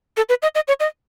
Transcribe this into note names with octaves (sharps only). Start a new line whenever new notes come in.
A4
B4
D#5
D#5
C#5
D#5